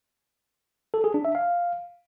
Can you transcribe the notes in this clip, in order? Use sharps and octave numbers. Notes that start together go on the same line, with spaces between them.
A4
G#4
D4
E5
F5